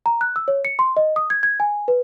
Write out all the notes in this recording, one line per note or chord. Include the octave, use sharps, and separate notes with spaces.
A#5
F#6
E6
C#5
C#7
C6
D#5
D#6
G#6
G#6
G#5
B4